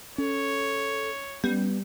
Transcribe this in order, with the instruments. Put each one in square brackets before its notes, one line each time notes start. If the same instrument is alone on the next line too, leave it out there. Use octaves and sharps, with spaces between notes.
[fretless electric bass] C#4 [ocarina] A4 [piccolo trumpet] C#5
[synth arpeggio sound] G3 [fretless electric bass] B3 [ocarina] C#4